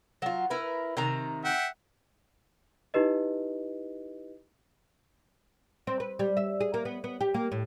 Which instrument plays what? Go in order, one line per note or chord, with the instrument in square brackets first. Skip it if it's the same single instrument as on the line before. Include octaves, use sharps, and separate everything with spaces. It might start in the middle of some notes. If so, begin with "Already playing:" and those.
[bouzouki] F#3 F4
E4 A#4 B4
C3 D#3 A#5
[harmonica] E5 F#5 G5
[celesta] D#4 E4 G4 B4 D#5
[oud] C4
B4
G3
E5
G#4
A#3
B3
B3
G4
A#3
A2